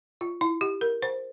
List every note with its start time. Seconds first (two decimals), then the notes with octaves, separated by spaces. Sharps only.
0.21 F4
0.41 E4
0.61 G4
0.81 A#4
1.02 C5